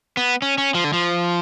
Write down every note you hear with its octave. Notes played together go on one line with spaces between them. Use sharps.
B3
C#4
C#4
F3
D3
F3